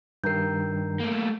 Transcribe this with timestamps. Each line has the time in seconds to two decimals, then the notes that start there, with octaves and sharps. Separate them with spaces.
0.24 G2 D#3 A#4 A#5 G6 C7
1.00 A3 A#3